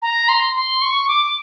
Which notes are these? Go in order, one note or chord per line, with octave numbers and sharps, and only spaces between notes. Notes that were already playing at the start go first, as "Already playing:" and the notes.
A#5
C6
C6
C#6
D6